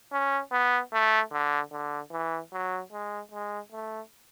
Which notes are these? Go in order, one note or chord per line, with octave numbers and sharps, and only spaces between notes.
C#4
B3
A3
D3
D3
E3
F#3
G#3
G#3
A3